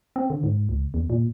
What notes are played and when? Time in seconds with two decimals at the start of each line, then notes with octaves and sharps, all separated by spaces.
0.16 C4
0.30 D3
0.43 G#2
0.69 C#2
0.94 E2
1.10 A#2